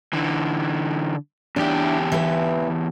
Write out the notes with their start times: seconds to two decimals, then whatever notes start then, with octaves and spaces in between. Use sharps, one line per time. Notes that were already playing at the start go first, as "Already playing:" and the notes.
0.13 D3 E3
1.56 E2 D4 E4 G4
2.12 E3 B4